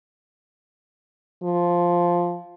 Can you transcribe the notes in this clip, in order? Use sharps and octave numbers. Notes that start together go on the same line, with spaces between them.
F3